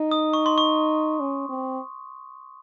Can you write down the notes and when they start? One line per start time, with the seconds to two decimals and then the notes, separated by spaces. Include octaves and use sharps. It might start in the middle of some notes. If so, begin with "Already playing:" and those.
Already playing: D#4
0.11 D#6
0.33 C#6
0.46 C6
0.58 C#6
1.20 C#4
1.49 C4